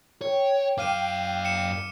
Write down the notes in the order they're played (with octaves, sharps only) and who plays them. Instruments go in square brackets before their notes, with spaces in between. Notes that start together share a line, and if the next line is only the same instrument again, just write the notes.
[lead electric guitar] C#5 [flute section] G5
[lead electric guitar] F#2 F5 [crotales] D6 F6 D#7
[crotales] C#7 E7